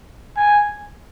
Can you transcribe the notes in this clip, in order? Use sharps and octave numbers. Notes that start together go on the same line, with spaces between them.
G#5